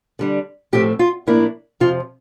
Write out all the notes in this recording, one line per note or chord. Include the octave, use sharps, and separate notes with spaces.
D3 G3 D4
A2 F3 A3 C4 G4
F4
A2 F3 A#3 D4 E4
F2 C3 F3 F4